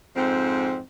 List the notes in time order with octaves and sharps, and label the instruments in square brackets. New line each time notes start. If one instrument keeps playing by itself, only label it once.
[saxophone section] F2 G#2 C4